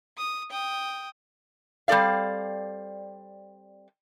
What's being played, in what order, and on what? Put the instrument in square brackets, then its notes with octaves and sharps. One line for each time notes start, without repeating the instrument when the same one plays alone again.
[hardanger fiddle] D#6
G5 D#6
[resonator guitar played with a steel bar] G3 C4 A4 D5 F5